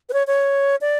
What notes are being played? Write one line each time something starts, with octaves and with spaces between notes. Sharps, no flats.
B4
C#5
C#5
D5